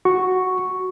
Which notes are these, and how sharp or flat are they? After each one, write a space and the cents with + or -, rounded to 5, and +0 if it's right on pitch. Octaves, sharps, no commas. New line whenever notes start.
F#4 +0 C#6 +0